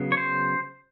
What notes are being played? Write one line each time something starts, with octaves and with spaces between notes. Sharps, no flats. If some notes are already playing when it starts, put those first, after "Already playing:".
Already playing: C#3 F#3 B3
C#5
C5